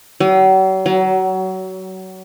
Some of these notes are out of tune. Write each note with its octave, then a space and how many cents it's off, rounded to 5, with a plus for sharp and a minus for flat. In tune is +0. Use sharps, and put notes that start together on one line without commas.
F#3 +45
F#3 +25